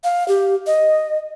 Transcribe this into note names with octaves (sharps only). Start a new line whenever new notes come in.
F5
G4
D#5